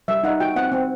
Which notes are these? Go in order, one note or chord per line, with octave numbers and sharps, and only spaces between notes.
G3 E5
D#4 F#5
F#4 G5
C4 F#5
C4